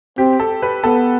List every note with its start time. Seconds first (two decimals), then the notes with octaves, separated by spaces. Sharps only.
0.18 C4 G4
0.40 A4
0.62 B4
0.84 B3 A4